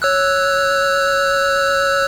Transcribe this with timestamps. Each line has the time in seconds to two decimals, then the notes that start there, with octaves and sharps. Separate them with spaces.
0.02 C#5 E6 F#6